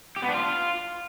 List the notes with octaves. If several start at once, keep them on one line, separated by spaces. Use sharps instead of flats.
G4
B3
D4
F4